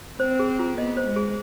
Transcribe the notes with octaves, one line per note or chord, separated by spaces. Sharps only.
C4 C5
G#4
F4
B3 D#5
C5
G#3
G#4